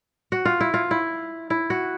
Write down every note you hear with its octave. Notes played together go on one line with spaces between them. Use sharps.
F#4
F4
E4
F4
E4
E4
F#4